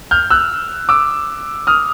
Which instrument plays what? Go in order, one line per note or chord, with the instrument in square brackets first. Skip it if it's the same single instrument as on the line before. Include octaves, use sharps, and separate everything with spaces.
[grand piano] F6 G6
E6 F#6
D6 E6
D#6 F6